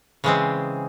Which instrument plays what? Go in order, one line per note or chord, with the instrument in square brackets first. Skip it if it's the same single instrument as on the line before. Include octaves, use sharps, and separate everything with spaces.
[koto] C#3 E3 G#3 C4